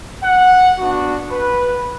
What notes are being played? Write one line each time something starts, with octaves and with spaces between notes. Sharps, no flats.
F#5
B3 D4 F#4
B4